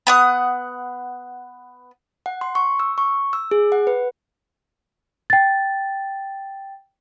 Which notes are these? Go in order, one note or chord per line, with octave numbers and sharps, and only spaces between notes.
B3 F#5 D#6
F#5
C6
C#6
E6
C#6
E6
G#4
F#5
B4
G5 A6